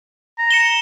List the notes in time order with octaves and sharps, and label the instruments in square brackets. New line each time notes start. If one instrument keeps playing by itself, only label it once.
[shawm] A#5
[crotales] C#7 E7 G7